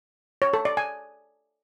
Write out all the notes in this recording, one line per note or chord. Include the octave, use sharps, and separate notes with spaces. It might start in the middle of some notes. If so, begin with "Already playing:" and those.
C#5
A4
D5
G#5